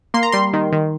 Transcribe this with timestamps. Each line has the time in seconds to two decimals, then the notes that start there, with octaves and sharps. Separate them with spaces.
0.14 A#3 C6
0.23 A#5
0.32 G3 C6
0.53 D#3
0.72 D#3